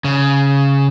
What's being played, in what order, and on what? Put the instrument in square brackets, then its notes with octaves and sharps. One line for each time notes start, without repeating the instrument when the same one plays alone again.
[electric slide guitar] C#3